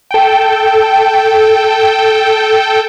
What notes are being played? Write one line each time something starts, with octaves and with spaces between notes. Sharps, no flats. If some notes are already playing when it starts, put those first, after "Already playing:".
A4 G5